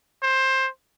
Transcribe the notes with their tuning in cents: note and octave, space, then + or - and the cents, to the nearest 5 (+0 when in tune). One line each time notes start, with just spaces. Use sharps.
C5 +15